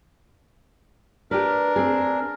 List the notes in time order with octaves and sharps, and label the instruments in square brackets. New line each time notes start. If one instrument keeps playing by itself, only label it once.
[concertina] D4 A#4 [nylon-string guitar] G4 B4
[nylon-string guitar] C4 G#4